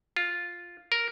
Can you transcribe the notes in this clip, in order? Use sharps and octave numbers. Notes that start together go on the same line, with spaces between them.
F4
A#4